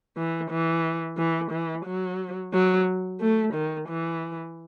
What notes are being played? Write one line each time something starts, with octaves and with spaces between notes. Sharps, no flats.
E3
E3
E3
E3
F#3
F#3
A3
D#3
E3